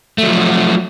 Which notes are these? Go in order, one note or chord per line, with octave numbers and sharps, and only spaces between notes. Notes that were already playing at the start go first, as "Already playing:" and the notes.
F3 F#3 A3